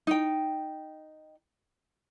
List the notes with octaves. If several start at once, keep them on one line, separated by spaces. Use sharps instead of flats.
D#4 G5